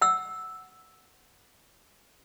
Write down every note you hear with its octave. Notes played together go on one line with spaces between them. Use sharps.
F#5 E6